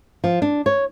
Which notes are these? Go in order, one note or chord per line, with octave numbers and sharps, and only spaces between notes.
F3
D4
C#5